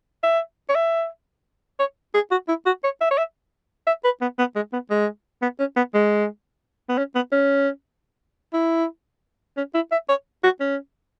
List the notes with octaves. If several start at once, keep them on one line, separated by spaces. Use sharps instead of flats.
E5
C#5
E5
C#5
G#4
F#4
E4
F#4
C#5
E5
C#5
E5
E5
B4
B3
B3
G#3
B3
G#3
B3
C#4
B3
G#3
B3
C#4
B3
C#4
E4
C#4
E4
E5
C#5
F#4
C#4